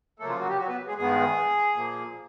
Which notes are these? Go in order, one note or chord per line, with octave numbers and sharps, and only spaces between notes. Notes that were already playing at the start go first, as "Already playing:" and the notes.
C#3 F#3 A3 A#3 A4
F3 F4
F#3 F#4
G3 G4
F#3 F#4
B3 B4
G#3 G#4
G2 D#3 G#3 B3 G#4
A#2 F3 A#3